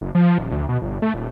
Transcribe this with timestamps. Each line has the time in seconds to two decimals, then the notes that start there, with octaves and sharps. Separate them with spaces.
0.01 F#1
0.15 F3
0.38 D#1
0.52 D2
0.69 B2
0.82 G1
1.02 A3
1.14 D#1